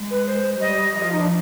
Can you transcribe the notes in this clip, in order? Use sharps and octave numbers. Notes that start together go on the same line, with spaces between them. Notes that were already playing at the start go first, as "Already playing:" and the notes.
Already playing: G#3
B4
C5
G3 D#5
F3 D#5
F4
D#4
D4